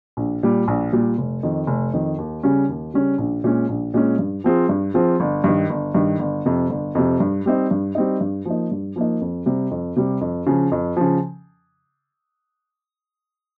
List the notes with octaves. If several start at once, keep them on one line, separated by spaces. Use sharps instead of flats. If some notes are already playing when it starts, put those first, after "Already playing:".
A#1
A#2 G3
A#1
A#2 G3
F1
F2 D#3
F1
F2 D#3
D#2
C#3 G3 C#4
D#2
C#3 G3 C#4
A#1
A#2 G#3 C#4
A#1
A#2 G#3 C#4
G2
F3 C4 F4 G#4
G2
F3 C4 F4 G#4
G1
G2 D#3
G1
G2 D#3
G1
F2 C3
G1
F2 C3
G2
G3 C4 D#4
G2
G3 C4 D#4
G2
F3 A#3 D#4
G2
F3 A#3 D#4
F2
C3 G3
F2
C3 G3
F2
C#3 F3
F2
C#3 F3